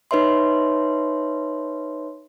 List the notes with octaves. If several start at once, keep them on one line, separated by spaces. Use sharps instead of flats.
D#4 B4 C#5 E5 C6